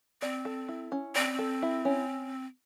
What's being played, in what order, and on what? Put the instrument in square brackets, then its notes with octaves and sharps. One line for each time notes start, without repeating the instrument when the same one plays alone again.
[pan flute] C4 [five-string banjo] D5
[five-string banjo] A4
E4
C#4
[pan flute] C4 [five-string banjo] D5
[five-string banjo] A4
E4
C#4